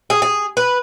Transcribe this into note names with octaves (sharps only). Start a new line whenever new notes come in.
G#4
G#4
B4